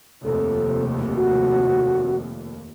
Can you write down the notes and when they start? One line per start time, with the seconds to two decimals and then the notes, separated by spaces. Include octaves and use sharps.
0.25 F1 D#2 A4
1.16 F#4